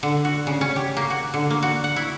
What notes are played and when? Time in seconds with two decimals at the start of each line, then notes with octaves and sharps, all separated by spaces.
0.03 D3
0.25 F#4
0.47 C#3
0.61 C#4
0.76 G4
0.97 A#3
1.10 F#4
1.34 D3
1.50 A#3
1.63 F#4
1.84 F#5
1.96 E4